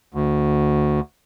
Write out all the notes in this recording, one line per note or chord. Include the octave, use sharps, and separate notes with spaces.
D2